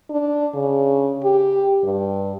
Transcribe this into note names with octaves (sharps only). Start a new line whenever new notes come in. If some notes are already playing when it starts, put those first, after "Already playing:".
D4
C#3
G4
G2